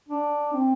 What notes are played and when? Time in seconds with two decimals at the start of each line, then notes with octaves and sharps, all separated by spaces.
0.09 D4
0.53 C4